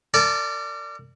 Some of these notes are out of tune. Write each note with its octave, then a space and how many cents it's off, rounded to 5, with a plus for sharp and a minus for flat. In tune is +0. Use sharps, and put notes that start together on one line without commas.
A#4 -40 D5 +0 A5 -20